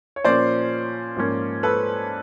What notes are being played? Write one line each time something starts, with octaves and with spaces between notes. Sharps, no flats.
C#5
A#2 F3 A#3 C#4 C5 D5
G#2 F3 A#3 C#4
A4 B4